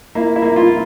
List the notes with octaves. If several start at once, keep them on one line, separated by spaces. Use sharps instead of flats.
A#3 E4
E4
A#3
F4